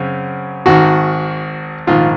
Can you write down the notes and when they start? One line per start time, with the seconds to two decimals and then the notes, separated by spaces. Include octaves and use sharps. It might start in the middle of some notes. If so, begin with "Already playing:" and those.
Already playing: F#2 C#3 C4
0.66 G#1 G#2 D#3 F#4
1.87 A#1 G#2 D#3 F4